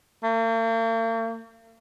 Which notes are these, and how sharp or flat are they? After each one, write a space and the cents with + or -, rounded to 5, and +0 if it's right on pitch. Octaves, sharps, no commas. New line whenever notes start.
A#3 -45